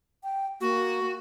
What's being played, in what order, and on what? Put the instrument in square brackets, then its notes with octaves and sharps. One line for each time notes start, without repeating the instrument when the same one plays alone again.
[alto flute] G5
[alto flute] A#3 [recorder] F#4